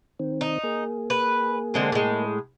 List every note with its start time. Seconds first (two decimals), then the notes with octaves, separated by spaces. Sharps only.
0.19 D#3 C4
0.41 D#4
0.64 A#3 G#4
1.10 B4
1.74 D3 G#3 C4
1.92 A2 G#3